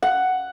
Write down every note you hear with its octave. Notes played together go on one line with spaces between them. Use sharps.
F#5